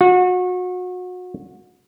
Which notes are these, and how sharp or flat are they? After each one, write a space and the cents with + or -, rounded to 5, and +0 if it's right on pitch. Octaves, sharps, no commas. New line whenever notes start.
F#4 -30